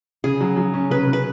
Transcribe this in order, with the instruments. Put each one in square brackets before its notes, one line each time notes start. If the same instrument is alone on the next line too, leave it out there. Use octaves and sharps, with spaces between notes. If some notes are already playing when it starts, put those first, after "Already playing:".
[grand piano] C#3 [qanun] G#4
[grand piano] F#3
F#3
C#4
[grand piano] C#3 [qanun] B4
[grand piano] C#3
[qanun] B4